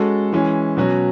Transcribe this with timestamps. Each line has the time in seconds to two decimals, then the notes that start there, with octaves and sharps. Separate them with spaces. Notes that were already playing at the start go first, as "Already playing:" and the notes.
Already playing: G#3 C#4 F#4 A4
0.33 E3 G#3 C#4
0.77 B2 F#3 C#4 F#4